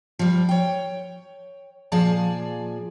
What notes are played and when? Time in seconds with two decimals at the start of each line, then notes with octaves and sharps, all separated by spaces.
0.19 F3 G3
0.49 C#5 G5
1.92 A#2 F3 G#4 D5 A5